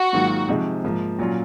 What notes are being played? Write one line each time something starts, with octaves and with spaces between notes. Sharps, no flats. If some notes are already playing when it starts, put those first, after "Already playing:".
Already playing: F#4
G#2 D#3 F#3 A#3 F4
C3 F3 G#3 D#4
G#2 F3 A#3
A#2 F#3 C#4 F4